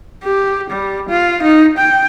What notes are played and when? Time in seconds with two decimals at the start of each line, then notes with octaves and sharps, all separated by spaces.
0.24 G4
0.70 G3
1.09 F4
1.43 D#4
1.78 G5